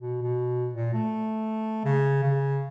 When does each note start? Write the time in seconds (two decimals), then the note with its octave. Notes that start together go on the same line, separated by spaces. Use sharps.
0.01 B2
0.23 B2
0.74 A#2
0.93 A3
1.84 C#3
2.23 C#3